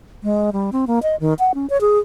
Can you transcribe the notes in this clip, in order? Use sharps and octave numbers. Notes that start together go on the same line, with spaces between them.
G#3
G3
C4
A#3
D#5
D#3
F#5
C#4
C#5
G#4